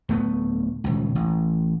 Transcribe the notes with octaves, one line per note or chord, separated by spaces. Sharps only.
D1 A3 B3
D#1 C#2
A1